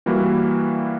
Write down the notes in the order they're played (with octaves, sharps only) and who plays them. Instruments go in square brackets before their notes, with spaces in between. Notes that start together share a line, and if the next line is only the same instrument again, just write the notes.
[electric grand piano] E3 G3 A#3 E4 F#4